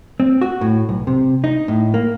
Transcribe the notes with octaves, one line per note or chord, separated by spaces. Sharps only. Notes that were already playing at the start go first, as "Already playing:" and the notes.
C4
F#4
A2
B1
C3
D#4
A2
A#3